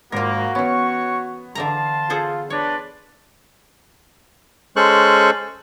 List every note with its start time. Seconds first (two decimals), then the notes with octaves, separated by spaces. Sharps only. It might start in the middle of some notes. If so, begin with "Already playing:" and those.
0.12 G#1 A#3 F4 F#4 A#4 A#6
0.55 E3 B3 C#4 C#5 C#6
1.55 D3 E3 F5 A5 A#5 C6
2.10 F4 G#4 A4 C5
2.50 D4 B4 C#5 D5 C6
4.76 G#3 C#4 A4 C5 C#6 F#6